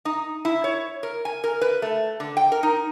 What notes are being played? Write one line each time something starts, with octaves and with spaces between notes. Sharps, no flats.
D#4
E4
C#5
A#4
G#5
A#4
B4
A3
D3
G5
A#4
D#4